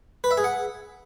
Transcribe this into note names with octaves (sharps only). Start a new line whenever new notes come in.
B4
E5
G#4
F#5